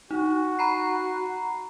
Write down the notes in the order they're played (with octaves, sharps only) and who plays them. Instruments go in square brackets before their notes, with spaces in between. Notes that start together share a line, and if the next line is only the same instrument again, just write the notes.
[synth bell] D#4 [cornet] F#4
[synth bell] A#5 B5 C7